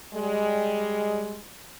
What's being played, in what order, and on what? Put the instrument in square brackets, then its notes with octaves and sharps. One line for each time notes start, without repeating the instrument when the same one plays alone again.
[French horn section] G3 G#3